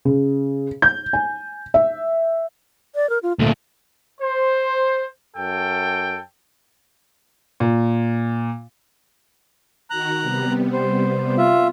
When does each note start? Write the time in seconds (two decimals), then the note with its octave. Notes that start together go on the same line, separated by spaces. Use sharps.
0.05 C#3
0.82 G6
1.13 G#5
1.74 E5
2.95 D5
3.10 A#4
3.23 F4
3.39 D2 A#2 A3
4.21 C5
5.35 F#2 A4 G5
7.60 A#2
9.90 D#3 F#4 A#4 A#5 F#6
10.22 C3 G3 B3
10.73 C5
11.38 F4 E5